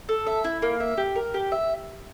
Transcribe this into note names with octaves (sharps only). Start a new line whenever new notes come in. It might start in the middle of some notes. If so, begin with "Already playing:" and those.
A4
E5
E4
A#3
E5
G4
A#4
G4
E5